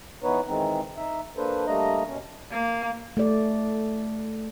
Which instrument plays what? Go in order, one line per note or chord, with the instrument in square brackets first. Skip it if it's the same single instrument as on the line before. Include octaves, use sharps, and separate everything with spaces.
[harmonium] E3 B3 D#4 B4 C#5
D#3 E3 G#3 C4 D#4
D#4 E5
A#3 D4 A4 B4 C5
G3 A3 A#3 D4 D#5 A#5
B2 C#4
[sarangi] A#3
[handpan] A3 D5